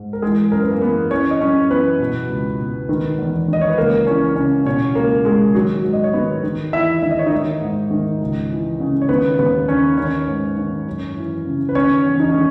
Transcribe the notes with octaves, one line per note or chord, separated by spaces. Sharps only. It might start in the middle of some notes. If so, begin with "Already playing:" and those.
Already playing: G#2
A#4
E3 G#3 G#4
F#2 A#4
B4
A#3 A#4
E3 B3 B4
E3 C#4 C#5
D#5
F#2 C#4 C#5
E3 B3 B4
B2
C#2
B2
D#3
E2
D#3 D#5
C#5
B4
C#2 A#3 A#4
E3 C#4 C#5
C#3 C#4 C#5
B2 C#4 C#5
C#2 A#3 A#4
B2 G#3 G#4
D#3 F#3 F#4
G#2
D#5
C#5
D#3 B3 B4
D#3
E2 E4 E5
D#3 E5
D#5
C#5
D#4 D#5
D#3
G#2
D#3
C#2
E3
C#3
C#5
D#3 B3 B4
D#2 B3 B4
D#3 C#4 C#5
D#3 C#4 C#5
G#2
D#3
F#2
E3
C#3
B4
D#3 C#4 C#5
E2
D#4
C#4
D#3